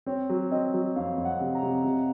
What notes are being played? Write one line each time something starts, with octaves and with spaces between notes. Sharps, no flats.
C4 C#5
F#3
C4 D#5
F#3
F2 F5
F2
F#5
C3
A#5
C3
C3